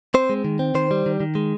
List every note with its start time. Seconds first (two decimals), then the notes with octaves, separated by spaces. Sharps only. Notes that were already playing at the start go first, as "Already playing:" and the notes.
0.14 C4 C5
0.30 G#3
0.44 D#3
0.59 C4
0.75 D#3 C5
0.91 G3
1.06 D#3
1.20 D#3
1.35 G#3